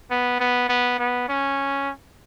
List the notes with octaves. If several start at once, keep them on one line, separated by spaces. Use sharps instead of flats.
B3
B3
B3
B3
C#4